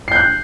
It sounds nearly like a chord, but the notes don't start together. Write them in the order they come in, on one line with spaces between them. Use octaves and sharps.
C7 G6 F#6